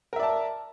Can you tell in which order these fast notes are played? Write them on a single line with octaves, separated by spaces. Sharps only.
A#4 E5 D5 A5